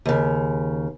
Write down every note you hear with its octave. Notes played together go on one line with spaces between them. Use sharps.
D#2 C#3